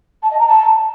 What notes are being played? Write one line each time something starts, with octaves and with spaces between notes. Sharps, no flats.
A5
D#5
A#5
A5